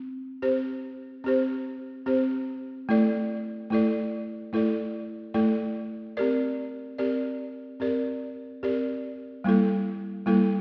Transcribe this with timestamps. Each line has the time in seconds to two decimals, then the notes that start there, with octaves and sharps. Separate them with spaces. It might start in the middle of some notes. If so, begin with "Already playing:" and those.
Already playing: C4
0.42 C4 G4 C5
1.24 C4 G4 C5
2.06 C4 G4 C5
2.89 A3 E4 A4 D5
3.70 A3 E4 A4 D5
4.53 A3 E4 A4 D5
5.34 A3 E4 A4 D5
6.17 C4 G4 A#4 D5
6.98 C4 G4 A#4 D5
7.80 C4 G4 A#4 D5
8.63 C4 G4 A#4 D5
9.44 G3 A#3 E4 A4
10.26 G3 A#3 E4 A4